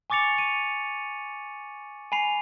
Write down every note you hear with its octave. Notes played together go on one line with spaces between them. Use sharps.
G#5 C#6 D6 A6 C#7 F7
D#7
G#5 B5 C7 F7